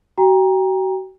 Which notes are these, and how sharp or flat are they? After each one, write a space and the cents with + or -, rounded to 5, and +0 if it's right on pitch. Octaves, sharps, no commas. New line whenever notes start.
F#4 +35 G5 +30 A#5 +10